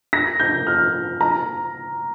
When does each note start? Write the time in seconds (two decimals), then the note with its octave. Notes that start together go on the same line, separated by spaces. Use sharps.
0.13 A#6
0.39 G6
0.67 F6
1.21 A#5